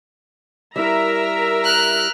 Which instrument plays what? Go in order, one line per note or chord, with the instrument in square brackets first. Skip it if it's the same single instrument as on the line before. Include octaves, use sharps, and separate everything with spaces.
[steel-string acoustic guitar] G3 E4 [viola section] A#4 E5 A#5
[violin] F6 F#6